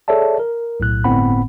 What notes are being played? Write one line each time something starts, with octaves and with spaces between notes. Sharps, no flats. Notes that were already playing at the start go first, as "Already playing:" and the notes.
G#4 A4 C#5 D5 E5 A5
A#4
B1 A2 F#6
G1 A2 B3 C4 F#5 B5